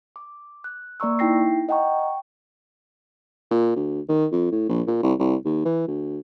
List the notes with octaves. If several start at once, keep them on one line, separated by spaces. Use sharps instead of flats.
D6
F#6
A#3 D5 A#5 C#6 E6
D#4 E4 G5 A#6 C7
D#5 F#5 G5 A#5 C#6
G5
A#2
D2
D#3
F2
A2
A#1
A#2
C2
C2
D#2
E3
D2